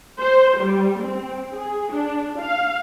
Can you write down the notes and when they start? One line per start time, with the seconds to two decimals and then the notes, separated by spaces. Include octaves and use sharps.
0.19 C5
0.58 G3
1.01 C4
1.53 G#4
1.91 D4
2.40 F5